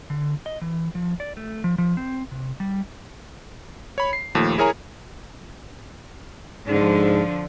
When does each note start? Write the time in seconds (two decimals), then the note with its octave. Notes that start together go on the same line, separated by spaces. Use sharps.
0.10 D3
0.46 D#5
0.62 E3
0.95 F3
1.20 D5
1.37 A3
1.64 F3
1.78 F3
1.97 C4
2.31 C3
2.60 G3
3.98 C#5 B5
4.13 C7
4.35 D#2 A#2 F3 A3
4.58 E4 G#4 A#4 C#5 G#5 A#5
6.67 G#2 D3 F3